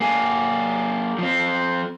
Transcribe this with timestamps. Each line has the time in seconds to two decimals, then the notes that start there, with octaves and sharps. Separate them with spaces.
0.01 A#3 G#4
1.18 F3 C4